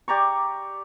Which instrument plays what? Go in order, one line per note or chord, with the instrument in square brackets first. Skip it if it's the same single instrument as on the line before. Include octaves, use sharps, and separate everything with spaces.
[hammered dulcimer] G4 D5 A#5 C#6